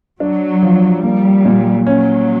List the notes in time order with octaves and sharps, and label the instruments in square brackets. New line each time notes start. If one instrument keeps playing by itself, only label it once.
[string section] F#3 [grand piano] D4
[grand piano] F3
[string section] G3 [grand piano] A#3
[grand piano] A#2
[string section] F#3 [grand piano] C#4